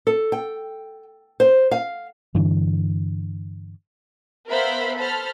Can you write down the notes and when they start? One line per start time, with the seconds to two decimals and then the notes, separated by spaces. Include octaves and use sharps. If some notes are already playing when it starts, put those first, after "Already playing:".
0.07 A4
0.32 G5
1.40 C5
1.71 F5
2.35 G2 D3 E3 D4
4.49 B3 A#4 C5 E5 F5 B5
4.97 A4 C5 A5 B5 F6